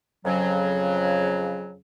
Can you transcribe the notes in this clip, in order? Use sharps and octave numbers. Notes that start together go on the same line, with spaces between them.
F2 C#3 F#3